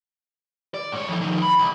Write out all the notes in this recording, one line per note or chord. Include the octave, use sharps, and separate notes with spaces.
D5
G#2 C#5
F2 E3
D#3 F3
B5
C2